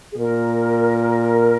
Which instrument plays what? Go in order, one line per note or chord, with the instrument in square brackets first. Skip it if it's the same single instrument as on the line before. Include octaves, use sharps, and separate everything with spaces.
[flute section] G#4
[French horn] A#2 [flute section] A#4